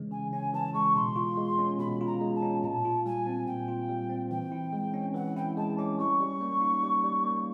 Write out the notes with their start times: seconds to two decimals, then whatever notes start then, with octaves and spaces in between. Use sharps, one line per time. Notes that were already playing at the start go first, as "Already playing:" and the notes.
Already playing: C#3 E3 G#3 C#4
0.11 C#3 G#5
0.32 C#4 G#5
0.53 E3 A5
0.74 G#3 C#6
0.95 B2 C6
1.16 F4
1.37 G#3
1.59 C#4
1.79 B2 B5
2.01 F4
2.07 A#5
2.21 G#3
2.35 A5
2.42 C#4
2.63 A#2 A5 A#5
2.85 F4
3.06 G3 G#5
3.27 C4
3.47 A#2 G5
3.68 F4
3.89 G3
4.09 C4
4.30 E3 G5
4.52 E4
4.73 G#3
4.94 C#4
5.14 E3 F#5
5.36 E4 G5
5.57 G#3 A5
5.78 C#4 D6
5.99 G3 C#6
6.20 G3
6.41 A#3
6.61 D#4
6.83 G3
7.03 G3
7.24 A#3